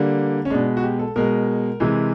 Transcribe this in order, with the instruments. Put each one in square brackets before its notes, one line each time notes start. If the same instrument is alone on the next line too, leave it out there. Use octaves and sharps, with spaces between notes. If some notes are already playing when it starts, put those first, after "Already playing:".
Already playing: [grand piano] D3 G3 A#3
C#4
B2 G#3 D4
F#4
G4
A4
B2 G#3 A#4
C3 E3 G#3